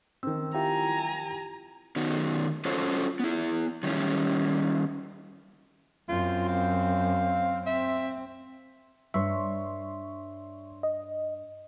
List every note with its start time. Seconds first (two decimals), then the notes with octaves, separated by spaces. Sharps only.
0.23 D#3 C4 E6
0.54 E4 F4 G4 G5 G#5 A#5
1.96 D#3 B3 C#4 D#4 F#4
2.65 C#4 F4 F#4 A4 C5 C#5
3.20 B3 E4
3.83 D#3 F#3 G3 C#4 E4
6.08 F#2 C4 F4
6.48 F5
7.67 C4 E5
9.14 G2 C#5 E5 C6 C#6
10.83 D#5